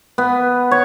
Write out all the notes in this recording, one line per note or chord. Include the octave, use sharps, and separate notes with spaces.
B3
C#5